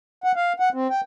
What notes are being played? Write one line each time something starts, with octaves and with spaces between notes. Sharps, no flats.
F#5
F5
F#5
C4
G5